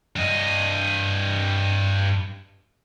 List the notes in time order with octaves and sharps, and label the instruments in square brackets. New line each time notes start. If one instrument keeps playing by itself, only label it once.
[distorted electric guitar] G2 D#5